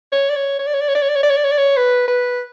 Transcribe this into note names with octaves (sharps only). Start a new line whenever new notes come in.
C#5
D5
C#5
C#5
D5
C#5
D5
C#5
D5
C#5
D5
C#5
D5
C#5
D5
C#5
D5
C#5
B4
B4